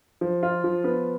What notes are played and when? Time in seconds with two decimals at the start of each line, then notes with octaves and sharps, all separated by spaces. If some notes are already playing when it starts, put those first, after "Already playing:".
0.21 F3
0.43 F4
0.64 F3
0.84 B3